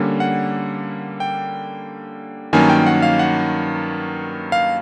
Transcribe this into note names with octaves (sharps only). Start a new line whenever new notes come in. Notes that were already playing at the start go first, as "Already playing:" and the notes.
Already playing: D3 G3 A#3 C#4
F#5
G5
G2 D#3 F#3 A#3 C#4 G#5
G5
F#5
F5
F#5
F5